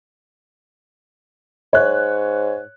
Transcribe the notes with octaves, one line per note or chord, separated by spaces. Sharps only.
G#2 C#5 F#6